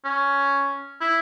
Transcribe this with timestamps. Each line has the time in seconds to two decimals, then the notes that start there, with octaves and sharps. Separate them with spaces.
0.05 C#4
1.01 E4